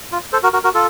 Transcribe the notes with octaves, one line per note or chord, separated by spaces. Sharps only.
F4
A4 C5
F#4 A#4
F#4 A#4
F#4 A#4
F4 A4